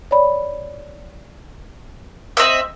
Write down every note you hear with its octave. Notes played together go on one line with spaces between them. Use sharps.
C#5 D5 B5
C4 D#5 E5